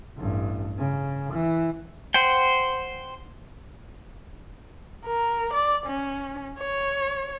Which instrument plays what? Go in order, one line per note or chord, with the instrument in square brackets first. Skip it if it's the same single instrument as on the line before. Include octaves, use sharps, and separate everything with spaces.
[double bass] A1 G2
C#3
E3
[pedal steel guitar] C5 F#5 G5
[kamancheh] A#4
D5
C#4
C#5